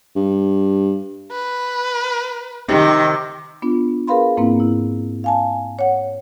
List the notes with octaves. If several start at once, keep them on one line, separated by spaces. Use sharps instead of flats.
G2
B4
C3 D#3 D#4 G4
B3 D4 F4
G#4 A#4 B4 F5 B5 C6
G#2 A#3 C4 E4
E4
F5 G#5 A5
C#5 F#5